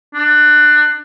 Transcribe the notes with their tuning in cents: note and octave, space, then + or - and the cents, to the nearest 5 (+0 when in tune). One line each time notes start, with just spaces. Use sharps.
D4 +25